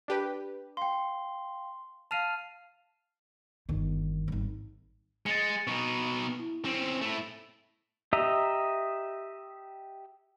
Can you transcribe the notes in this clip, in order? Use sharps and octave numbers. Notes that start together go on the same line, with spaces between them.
D4 G4 B4
F5 G5 C6
F5 A5 F6 C7 D#7 F7
G1 D#3
G#1 G3
G#3 A6 C#7
B2 D#4 C#6
E4
C4 C#4
A3 E4
G4 D#5 E5 A#5